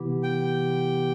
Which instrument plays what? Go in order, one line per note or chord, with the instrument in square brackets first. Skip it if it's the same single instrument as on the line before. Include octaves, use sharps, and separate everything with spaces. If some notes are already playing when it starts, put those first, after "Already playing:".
Already playing: [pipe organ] C3 E3 B3 E4 G4
[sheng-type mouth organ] G5